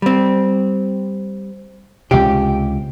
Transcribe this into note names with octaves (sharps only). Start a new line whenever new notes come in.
G3 C4
C#2 C3 G4